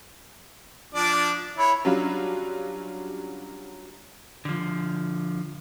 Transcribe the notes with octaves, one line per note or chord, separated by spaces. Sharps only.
F3 D4 D5
E4 C#5 B5
F#3 G3 C#4 D4 F4
D3 F3